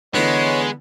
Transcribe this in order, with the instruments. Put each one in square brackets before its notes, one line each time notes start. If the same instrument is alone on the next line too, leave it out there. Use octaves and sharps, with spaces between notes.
[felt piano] D3 E3 [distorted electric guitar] G#3 [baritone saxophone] B3 [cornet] C#5